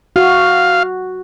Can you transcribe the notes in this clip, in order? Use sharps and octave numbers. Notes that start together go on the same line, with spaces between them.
F#4 F5